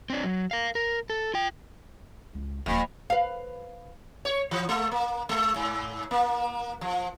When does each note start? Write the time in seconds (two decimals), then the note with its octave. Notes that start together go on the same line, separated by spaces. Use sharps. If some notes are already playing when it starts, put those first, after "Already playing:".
0.10 C4 D4
0.24 F#3
0.51 A#4 F5
0.75 A#4
1.10 A4
1.34 F4 G5
2.35 C#2
2.66 D#1 F2 A#3
3.10 B4 F5
4.25 C#5
4.51 E3
4.69 G#3
4.91 A#3
5.29 G#3
5.56 G#2
6.11 A#3
6.81 F3